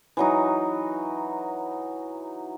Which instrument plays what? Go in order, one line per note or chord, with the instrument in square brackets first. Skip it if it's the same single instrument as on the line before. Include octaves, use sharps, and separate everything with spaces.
[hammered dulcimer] E3 F#3 D#4